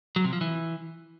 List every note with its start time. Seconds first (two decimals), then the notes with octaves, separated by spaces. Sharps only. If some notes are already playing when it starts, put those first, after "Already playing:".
0.16 F#3
0.24 C3
0.33 F3
0.41 E3